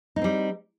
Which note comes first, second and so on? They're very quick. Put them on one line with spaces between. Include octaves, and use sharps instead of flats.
D#4 A#3 C4 G3